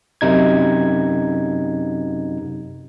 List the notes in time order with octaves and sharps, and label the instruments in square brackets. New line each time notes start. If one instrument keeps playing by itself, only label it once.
[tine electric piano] F#2 C3 D#4 G#6